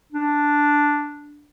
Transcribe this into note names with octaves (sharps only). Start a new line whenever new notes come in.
D4